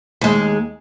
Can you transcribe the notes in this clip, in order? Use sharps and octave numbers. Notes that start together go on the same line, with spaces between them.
D#2 G#3